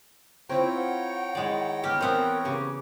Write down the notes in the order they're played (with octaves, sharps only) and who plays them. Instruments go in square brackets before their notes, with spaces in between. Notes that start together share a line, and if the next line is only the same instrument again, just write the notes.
[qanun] C4 E4 F4 [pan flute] C5 [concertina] C#5 G5 A#5
[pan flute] F#5
[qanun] D#3 E4 [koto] G#3 D5
[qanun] B3 B4 E5 [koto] G4 [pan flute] F6
[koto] E3 B3 C4 [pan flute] A#4 [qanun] C5
[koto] C#3 [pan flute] G4 [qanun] C#6